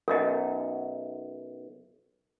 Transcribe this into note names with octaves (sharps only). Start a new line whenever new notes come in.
B1 F#2 A#4 D#5